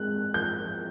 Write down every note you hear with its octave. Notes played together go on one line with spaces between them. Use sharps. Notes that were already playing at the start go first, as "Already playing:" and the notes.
Already playing: G#3 C4 F#6
F3 G6